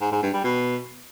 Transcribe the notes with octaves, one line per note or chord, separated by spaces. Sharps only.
G#2
G#2
G2
G3
B2